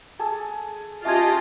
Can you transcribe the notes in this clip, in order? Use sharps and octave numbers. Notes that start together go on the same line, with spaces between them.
G#4 A4 A5
C#4 F4 G4 D#5 E5 A5 G#6